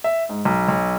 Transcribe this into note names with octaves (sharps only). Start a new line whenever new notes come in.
E5
G#2
B1
B1